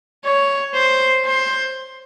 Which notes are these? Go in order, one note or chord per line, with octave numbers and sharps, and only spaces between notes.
C#5
C5
C5